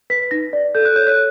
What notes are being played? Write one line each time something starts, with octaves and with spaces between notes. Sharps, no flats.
B4 B6
D#4 A#6
D5
A4 G6
F#6
C#5 G6
F#6